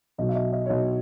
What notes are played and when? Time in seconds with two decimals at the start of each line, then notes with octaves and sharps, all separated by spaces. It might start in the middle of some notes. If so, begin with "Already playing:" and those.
0.18 B1 B2 F#3 D#5
0.29 E5
0.35 D#5
0.53 D#5
0.66 C#5
0.69 B1 B2 F#3 D#5